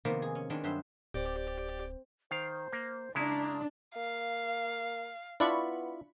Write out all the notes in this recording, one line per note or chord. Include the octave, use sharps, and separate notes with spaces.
C3 D#3 F3 A#3 B3
G#4
C#4
D#3 G#3 B3 C4 D4
G2 F#3 C5 E5 C6
D1 C4 G4 C5 D5
D#3 C5 F5
A#3
C#3 G#3 D4 E4 A#5
A#3 F5
B3 D4 E4 F4 D5 B5 C#6